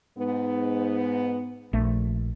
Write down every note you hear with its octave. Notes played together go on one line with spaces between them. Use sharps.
G#2 B3
A#1 A3